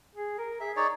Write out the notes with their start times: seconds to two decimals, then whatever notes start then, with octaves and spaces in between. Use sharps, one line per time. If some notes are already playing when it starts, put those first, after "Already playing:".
0.15 G#4
0.38 A#4
0.60 G#4 E5
0.76 D#4 C#5 D5